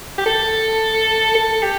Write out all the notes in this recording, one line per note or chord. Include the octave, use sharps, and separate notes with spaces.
G4
A4
A4
G4